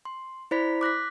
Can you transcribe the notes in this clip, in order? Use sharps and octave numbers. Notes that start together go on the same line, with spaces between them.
C6
E4 C5 D5 B5 B6
D6 F#6 A#6 B6